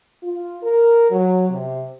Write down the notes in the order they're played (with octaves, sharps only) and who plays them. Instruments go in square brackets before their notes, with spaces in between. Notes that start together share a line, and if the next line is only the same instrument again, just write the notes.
[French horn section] F4
A#4
F#3
C3